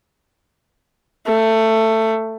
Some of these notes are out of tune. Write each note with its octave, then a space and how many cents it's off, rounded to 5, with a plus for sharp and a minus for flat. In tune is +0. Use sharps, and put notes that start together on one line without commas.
A3 +15